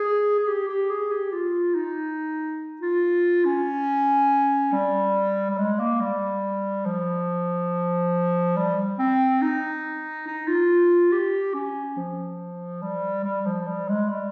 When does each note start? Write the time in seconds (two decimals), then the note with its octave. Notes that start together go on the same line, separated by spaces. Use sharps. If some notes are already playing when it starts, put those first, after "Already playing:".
Already playing: G#4
0.39 G#4
0.48 G4
0.69 G4
0.90 G#4
1.11 G4
1.32 F4
1.75 D#4
2.81 F4
3.45 C#4
4.72 G3
5.51 G3
5.58 G#3
5.80 A#3
6.01 G3
6.86 F3
8.57 G3
8.99 C4
9.42 D#4
10.27 D#4
10.48 F4
11.12 G4
11.54 C#4
11.97 F3
12.82 G3
13.24 G3
13.46 F3
13.67 G3
13.89 G#3
14.10 G3